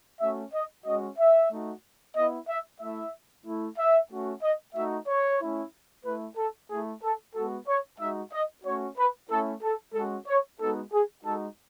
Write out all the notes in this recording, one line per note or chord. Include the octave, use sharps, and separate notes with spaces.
A3 C#4 F#4 E5
D#5
G#3 C#4 F#4 D#5
E5
A3 D#4 F#4
B3 E4 D#5
E5
A3 E4 E5
A3 E4
E5
A3 C#4 F#4
D#5
A3 D#4 F#4 E5
C#5
A3 C#4 E4
A3 E4 B4
A4
A3 E4 G#4
A4
G#3 B3 F#4 A4
C#5
G#3 D#4 F#4 E5
D#5
A3 C#4 F#4 C#5
B4
A3 C#4 E4 A4
A4
G#3 C#4 F#4 A4
C#5
G#3 B3 D#4 F#4 A4
G#4
G#3 D#4 F#4 A4